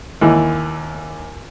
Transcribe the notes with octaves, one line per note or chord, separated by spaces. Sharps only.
D#2 E3